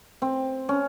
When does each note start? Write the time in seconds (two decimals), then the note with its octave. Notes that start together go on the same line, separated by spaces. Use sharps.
0.22 C4
0.69 C#4